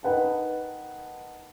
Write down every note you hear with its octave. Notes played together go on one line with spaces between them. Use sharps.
D#4 A#4 B4 F#5 G5 A5